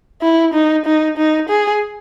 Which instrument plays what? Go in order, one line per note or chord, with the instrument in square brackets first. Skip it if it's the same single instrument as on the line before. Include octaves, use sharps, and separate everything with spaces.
[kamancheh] E4
D#4
D#4
D#4
G#4